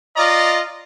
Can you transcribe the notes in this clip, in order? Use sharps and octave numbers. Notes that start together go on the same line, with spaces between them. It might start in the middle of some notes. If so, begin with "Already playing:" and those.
F4 D5 D#5 A#5